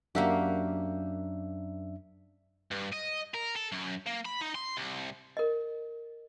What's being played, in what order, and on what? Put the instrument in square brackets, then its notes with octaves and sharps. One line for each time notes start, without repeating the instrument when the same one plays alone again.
[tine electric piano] F#2 D4 E5 [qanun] A#3 F#4 G4
[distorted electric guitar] G2
D#5
A#4
A4
F#2
A#3
B5
D#4
C6
C2
[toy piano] A#4 D#5